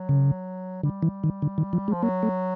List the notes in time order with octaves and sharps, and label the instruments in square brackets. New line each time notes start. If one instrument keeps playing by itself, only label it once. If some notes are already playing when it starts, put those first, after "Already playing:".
Already playing: [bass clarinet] F#3
[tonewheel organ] C#3
[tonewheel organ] D3 [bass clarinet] G3
[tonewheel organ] E3
D#3
D3
D#3
F3
G#3
[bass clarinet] F3
[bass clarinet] F#3 [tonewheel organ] A#3
[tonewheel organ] A3